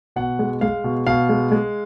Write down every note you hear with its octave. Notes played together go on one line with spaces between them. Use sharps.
B2 F#5
G#3
G#3 F5
B2
B2 F5
G#3
G#3